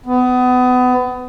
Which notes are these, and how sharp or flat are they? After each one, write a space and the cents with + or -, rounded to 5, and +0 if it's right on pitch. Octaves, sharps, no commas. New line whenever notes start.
B3 +25